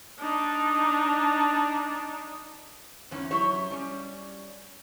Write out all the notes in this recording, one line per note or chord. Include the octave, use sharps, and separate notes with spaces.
D4 D#4
E2 G#2 C#4
F#2 F#3 E4 G4 C#5
G3 C#4